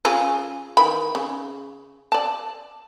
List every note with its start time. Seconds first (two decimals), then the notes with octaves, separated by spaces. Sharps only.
0.05 C#3 F4 G#4
0.77 D#3 E3 B5
1.15 C#3
2.12 D5 A5